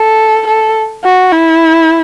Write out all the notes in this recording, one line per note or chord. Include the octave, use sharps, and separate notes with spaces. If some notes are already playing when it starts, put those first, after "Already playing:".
Already playing: A4
A4
F#4
E4